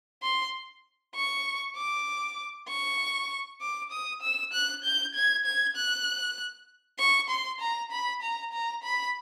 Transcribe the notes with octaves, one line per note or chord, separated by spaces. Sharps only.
C6
C#6
D6
C#6
D6
D#6
E6
F#6
G6
G#6
G#6
F#6
C#6
C6
A#5
B5
A#5
A#5
B5